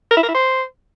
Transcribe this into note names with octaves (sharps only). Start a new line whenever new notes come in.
A#4
E4
A#4
E4
C5